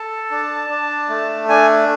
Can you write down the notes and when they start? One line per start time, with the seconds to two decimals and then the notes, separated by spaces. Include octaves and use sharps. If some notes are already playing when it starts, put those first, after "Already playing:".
Already playing: A4 A5
0.31 D4
0.69 D4
1.09 A3
1.49 D4 G#5